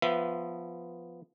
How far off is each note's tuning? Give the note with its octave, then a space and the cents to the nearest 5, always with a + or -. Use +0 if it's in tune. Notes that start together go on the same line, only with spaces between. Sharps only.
F3 +0 B3 +0 E5 +25